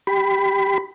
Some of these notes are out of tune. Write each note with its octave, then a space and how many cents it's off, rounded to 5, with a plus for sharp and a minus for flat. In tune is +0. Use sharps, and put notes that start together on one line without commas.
G4 +0 B5 +20